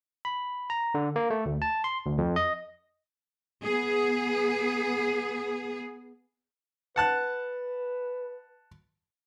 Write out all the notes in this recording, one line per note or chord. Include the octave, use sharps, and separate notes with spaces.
B5
A#5
D3
A#3
A3
D2
A5
C6
D2
F2
D#5
B3 G#4
B4 F#5 A5 F#6